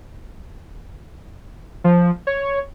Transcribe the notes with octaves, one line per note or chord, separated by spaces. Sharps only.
F3
C#5